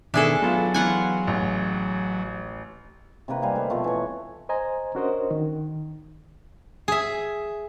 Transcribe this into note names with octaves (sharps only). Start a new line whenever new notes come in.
B2 D#3 D4 G#4 A4 E5 G#5
F#3 B3 F4
E3 B3 F4 F#5 G#5
A1
C3 D#3 A#3 B4
G3 D#5 F5 G#5
A3 B4
B2 F3 A3
E3 C#5
C5 D#5 G#5 A#5
C#4 D4 F#4 A#4 C5 D#5
D#3
G#4 E5